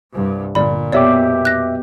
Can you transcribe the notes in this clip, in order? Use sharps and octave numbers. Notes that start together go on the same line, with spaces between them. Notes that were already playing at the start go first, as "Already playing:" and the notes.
C2 G2
G1 A#2 D5 B5
F2 B2 G4 C#5 D5 E5 D6
F#6 A#6